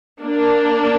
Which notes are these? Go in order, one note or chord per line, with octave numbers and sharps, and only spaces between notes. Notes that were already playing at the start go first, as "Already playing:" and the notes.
A#3 D4